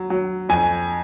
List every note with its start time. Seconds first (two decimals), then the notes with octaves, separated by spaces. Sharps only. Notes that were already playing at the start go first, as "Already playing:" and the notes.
Already playing: F#3
0.10 F#3
0.49 F2 G#5